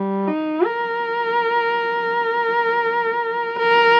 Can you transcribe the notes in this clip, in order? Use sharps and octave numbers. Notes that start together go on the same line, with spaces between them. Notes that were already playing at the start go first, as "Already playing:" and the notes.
Already playing: G3
D#4
A#4
A#4